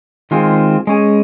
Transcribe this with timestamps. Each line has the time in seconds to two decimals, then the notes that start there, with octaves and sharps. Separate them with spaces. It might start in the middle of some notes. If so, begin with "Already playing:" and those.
0.31 D#3 G#3 C4 F4 G#4
0.87 G#3 C#4 G#4